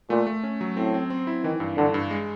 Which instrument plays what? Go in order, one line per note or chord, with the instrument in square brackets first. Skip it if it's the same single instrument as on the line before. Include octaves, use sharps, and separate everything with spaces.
[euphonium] A#2 [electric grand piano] A3
[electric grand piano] A3
C#4
F#3
[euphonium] A2 [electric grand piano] C4
[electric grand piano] C4
C4
E4
[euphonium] D#3 [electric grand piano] E3
[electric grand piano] G2
[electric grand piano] G2 [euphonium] D3
[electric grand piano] G2
G#3